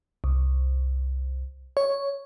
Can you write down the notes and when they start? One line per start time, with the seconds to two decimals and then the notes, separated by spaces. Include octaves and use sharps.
0.24 C2
1.77 C#5